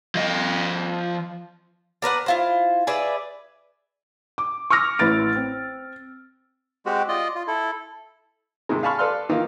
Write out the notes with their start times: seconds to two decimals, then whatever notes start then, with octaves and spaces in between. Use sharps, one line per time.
0.15 F3 D#5
2.02 D4 A#4 B4 F#5
2.26 E4 F4 C5
2.87 G#4 B4 D5 E5
4.38 D6
4.70 C#6 D6 E6 F6 A#6
4.99 A1 E4 B4 B5 A6 D7
5.36 C4
6.86 G#3 C4 F#4 G4
7.08 F4 D5 D#5
7.35 F4
7.48 E4 A4
8.69 G#2 C3 D#3 G#3
8.83 F5 G#5 A5 B5 C#6 F6
8.99 A4 B4 D5 F5 C6 F6
9.29 D#3 E3 A#3 D#4 F4